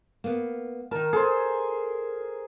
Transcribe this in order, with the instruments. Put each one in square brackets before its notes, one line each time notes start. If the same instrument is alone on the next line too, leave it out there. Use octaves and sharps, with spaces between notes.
[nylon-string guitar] A#3 B3
[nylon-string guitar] D#3 A5 [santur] A#4
[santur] G#4 C5 [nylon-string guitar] A4